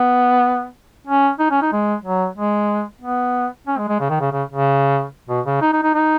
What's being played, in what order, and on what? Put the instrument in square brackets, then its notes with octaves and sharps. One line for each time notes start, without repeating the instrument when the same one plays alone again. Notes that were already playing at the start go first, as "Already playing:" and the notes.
Already playing: [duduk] B3
C#4
D#4
C#4
D#4
G#3
F#3
G#3
B3
C#4
G#3
G#3
C#3
D#3
C#3
C#3
C#3
B2
C#3
D#4
D#4
D#4
D#4